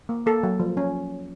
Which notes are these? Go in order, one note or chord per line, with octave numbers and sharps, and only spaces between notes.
A#3
A#3 A4
F#3
F3
C#4